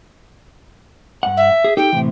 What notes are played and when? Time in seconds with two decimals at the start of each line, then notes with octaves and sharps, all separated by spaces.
1.23 G2 F#5
1.37 E5
1.64 G#4
1.77 D#4 G4 A4 G5
1.93 A2 C3 E3